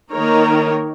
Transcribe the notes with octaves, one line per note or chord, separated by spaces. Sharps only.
D#3 A#3 D#4 A#4 C#5